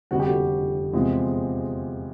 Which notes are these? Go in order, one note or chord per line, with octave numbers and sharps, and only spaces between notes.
F1 F2 D3 G3 F#4
G4
F#4
E2 C3 F3 G#3 C4